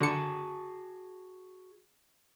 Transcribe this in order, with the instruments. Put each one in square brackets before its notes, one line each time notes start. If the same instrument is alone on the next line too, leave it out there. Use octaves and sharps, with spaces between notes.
[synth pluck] D3 C#7 [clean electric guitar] F#4 G#4 A5